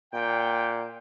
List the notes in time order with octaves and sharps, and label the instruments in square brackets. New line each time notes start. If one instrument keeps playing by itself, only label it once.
[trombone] A#2 [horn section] G5